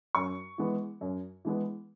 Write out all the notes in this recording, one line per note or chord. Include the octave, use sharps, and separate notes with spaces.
F#2 C#6
E3 G#3 B3
F#2
E3 G#3 B3